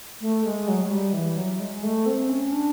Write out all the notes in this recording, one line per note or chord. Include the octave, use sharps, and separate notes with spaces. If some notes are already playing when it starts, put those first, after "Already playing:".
A3
G#3
F#3
G#3
G3
E3
F#3
G#3
A3
C4
C#4
D4